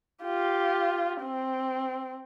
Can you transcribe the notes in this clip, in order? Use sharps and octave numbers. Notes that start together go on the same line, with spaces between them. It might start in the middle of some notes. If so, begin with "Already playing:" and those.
F4 G4
C4